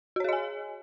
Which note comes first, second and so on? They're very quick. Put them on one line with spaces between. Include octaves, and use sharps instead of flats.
F#4 C#5 G#4 D#5 G#5